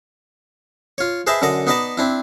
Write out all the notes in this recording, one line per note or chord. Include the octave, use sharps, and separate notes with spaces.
F4 C#5
G#4 B4 C5 D#5 E5 A5
F#2 D3 A4 D5 D#5
B3 D#4 B4 D5 D#5 A5
C4 D4 E4